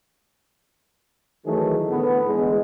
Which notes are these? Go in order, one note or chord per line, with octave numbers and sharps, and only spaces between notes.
D#3 E3 F#3 A3 G#4
A2 D3 B3
E2 G#3